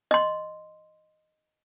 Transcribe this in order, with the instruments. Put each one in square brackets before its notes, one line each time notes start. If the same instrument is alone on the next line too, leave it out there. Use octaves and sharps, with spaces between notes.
[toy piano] D#5 C6